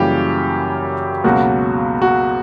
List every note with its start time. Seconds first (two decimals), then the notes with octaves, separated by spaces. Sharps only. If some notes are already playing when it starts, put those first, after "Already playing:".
Already playing: F#2 C#3 E3 G3 A#3 G4
1.24 C#2 B2 F#3 A#3 F#4
2.02 F#4